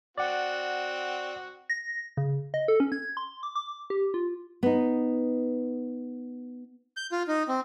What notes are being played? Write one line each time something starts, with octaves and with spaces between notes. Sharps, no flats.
C4 F#4 D5 F#5
A#6
C#3
D#5
A4
C#4
G#6
C6
D6
D6
G4
F4
B3 D#4
G6
F4
D#4
C4